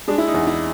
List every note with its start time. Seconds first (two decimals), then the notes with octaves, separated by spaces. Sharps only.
0.08 G#3 D4
0.18 E4
0.28 D#4
0.34 E2
0.47 E4